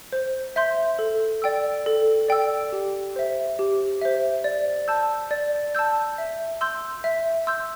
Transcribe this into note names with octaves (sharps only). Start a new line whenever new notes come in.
C5
E5 C6 G6
A4
D5 G5 E6
A4
D5 G5 E6
G4
C5 E5
G4
C5 E5
D5
A5 E6 G6
D5
A5 E6 G6
E5
C6 E6 G6
E5
C6 E6 G6